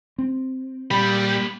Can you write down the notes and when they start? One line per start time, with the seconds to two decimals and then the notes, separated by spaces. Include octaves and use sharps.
0.18 C4
0.91 A#2 G3 A#3 B5